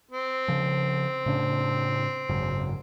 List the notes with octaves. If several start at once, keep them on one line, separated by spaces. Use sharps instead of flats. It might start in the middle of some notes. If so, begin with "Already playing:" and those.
C4
C#3 F3
A2 C#3 D4
G#1 F#2 C#3